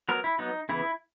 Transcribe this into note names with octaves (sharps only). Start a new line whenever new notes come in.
F#3 B3 A#4
E4
F#3 B3 D#4
C#3 E3 B3 E4